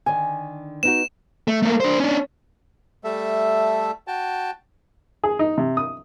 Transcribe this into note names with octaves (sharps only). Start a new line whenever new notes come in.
D3 D#3 G#5
B3 D#4 F#4 E7
A3
A3 A#3
D4 C5
C#4 D4
G3 A3 A4 E5
F#4 G5 A5
G#4
D#4
C3
D#6